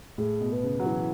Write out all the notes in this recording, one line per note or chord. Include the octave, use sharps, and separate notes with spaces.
A2 G#4
B2
B4
C#3
F#3
E3 E4